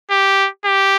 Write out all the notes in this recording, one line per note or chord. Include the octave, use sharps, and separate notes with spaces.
G4
G4